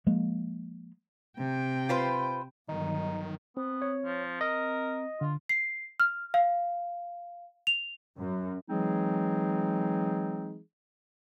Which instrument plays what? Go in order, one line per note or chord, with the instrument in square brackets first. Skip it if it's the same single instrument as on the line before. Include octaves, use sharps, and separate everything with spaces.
[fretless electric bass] F3 G#3 A#3
[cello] C3 G5
[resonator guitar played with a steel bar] F4 B4 C5
[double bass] G1 F#3 [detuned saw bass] D#3 [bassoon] D#4
[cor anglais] B3 [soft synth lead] C4
[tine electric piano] C#5
[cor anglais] F3
[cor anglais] A#4 [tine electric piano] D#5
[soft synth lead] D3 [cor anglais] F4
[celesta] C7
F6
F5
F7
[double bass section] F#2
[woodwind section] E3 F#3 G#3 C4 D#4 G#4